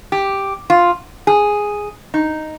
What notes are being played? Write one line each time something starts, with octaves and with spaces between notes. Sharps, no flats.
G4
F4
G#4
D#4